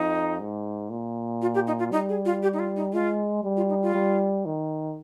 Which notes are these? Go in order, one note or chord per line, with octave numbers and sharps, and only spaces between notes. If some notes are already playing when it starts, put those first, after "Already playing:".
Already playing: F2 D#4
G#2
A#2
F4
G4
D#4
F4
G3 D#4
G#4
F4
G4
D#4
F4
D#4
G#3 F4
G3
F4
D#4
F4
G3
D#3